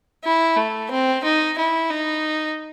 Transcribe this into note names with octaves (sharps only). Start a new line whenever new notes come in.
E4
A3
C4
D#4
E4
D#4